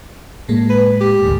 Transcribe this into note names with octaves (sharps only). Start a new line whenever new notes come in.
A2 G#3 A#3
B4
G4
A1 D2 G#2